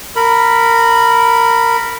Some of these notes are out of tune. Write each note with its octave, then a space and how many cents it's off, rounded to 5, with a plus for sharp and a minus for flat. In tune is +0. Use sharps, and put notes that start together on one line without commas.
A#4 -15 B5 -5